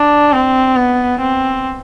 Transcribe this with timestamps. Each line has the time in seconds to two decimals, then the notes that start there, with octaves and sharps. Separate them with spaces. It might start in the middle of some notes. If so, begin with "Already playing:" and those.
Already playing: D4
0.33 C4
0.77 B3
1.20 C4